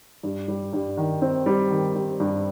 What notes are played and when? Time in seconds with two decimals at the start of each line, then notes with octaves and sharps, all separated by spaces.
0.23 G2
0.48 G3
0.73 G2
0.97 D#3
1.22 C4
1.46 G3
1.71 D#3
1.95 G3
2.20 G2